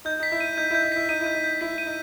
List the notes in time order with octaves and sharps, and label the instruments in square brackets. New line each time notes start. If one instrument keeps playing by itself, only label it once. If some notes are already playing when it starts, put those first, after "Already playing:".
[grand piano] D#4 [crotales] G6
[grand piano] D#4 [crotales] B6
[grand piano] E4
[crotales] D#7
[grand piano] D#4 [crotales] G6
[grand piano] E4 [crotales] G6
[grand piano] D#4
[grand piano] E4 [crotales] B6
[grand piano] D#4 [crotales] D#7
[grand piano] E4
[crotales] G6
[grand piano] D#4
[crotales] G6
[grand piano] E4 [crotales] B6
[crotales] D#7
[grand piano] D#4